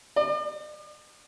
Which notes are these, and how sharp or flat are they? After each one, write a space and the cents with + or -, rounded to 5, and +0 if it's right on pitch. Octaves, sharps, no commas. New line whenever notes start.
D5 +45